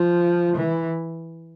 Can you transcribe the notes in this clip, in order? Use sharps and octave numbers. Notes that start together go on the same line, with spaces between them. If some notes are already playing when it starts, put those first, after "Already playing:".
Already playing: F3
E3